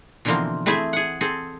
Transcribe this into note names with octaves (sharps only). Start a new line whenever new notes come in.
B2 D3 E3 F3 A#3 C4
A3 C4 E4 G#4 E5
G#4 F#5
C4 G#4 A4